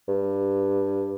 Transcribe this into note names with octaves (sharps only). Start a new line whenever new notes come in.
G2